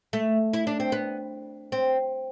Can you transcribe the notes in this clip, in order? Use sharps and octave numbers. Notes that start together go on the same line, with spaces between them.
A3
E4
D4
C4
B3
C4